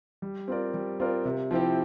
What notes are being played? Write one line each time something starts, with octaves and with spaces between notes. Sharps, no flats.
G3
C4 F4 A#4 D5
G3
C4 F4 A#4 D5
C3
F3 C4 E4 G4